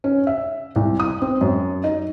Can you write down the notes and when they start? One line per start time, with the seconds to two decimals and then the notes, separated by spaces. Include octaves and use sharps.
0.04 C#4
0.27 E5
0.76 C2
1.00 D#6
1.22 C4
1.41 F#2
1.84 D#4